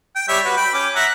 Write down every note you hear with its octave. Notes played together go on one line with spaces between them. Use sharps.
G5
G3 C#5 E5
F#4 B4
G5 B5
C#4 D6
E5 F#5 A#5